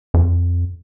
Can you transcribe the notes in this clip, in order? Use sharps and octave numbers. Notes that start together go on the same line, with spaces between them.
F2